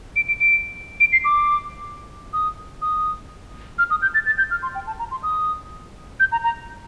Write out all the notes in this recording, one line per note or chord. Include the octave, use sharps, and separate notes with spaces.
D7
D7
D7
D7
C7
D6
D#6
D#6
F6
D#6
G6
A6
A6
G6
F6
C6
G5
A5
A#5
C6
D#6
G6
A#5
A#5